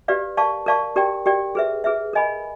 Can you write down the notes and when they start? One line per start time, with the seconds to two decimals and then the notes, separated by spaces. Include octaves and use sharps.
0.08 G4 B4 D5 F5
0.37 A#4 D5 F5 A5 C#6
0.66 A#4 D5 F5 A5 C#6
0.96 G4 A#4 D5 G5
1.26 G4 A#4 D5 G5
1.55 G#4 B4 E5
1.84 G#4 B4 E5
2.13 A#4 D#5 G#5 B5